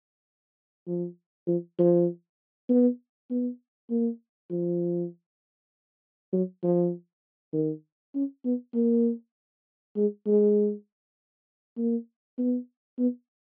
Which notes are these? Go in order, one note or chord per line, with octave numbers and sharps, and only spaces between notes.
F3
F3
F3
B3
B3
A#3
F3
F#3
F3
D#3
C#4
B3
A#3
G#3
G#3
A#3
B3
B3